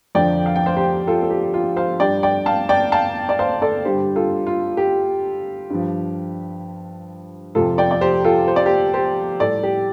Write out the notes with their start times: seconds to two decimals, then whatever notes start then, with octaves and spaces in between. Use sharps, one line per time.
0.15 F2 D3 F3 D5 G5
0.46 F5
0.56 G5
0.66 C5 F5
0.76 G4 C5
1.07 F4 A4
1.23 A4
1.30 G4
1.54 F4
1.76 C5 F5
2.00 G2 G3 D5 G5
2.23 D5 G5
2.46 F5 A5
2.69 D5 G5
2.92 F5 A5
3.29 D5
3.39 C5 F5
3.62 A4 D5
3.85 G2 D3 G3 G4 C5
4.16 F4 A4
4.47 F4
4.77 G4
5.70 G2 F3
7.55 F2 C3 F3 F4 A4
7.78 D5 G5
7.91 D5
8.01 G4 C5
8.24 F4 A4
8.48 C5
8.56 D5
8.66 G4 C5
8.94 G4 C5
9.40 A2 G3 A4 D5
9.63 G4